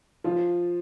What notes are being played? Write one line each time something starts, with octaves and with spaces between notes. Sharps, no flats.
F3 F4